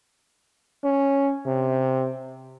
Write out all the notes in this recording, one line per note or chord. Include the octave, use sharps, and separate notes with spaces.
C#4
C3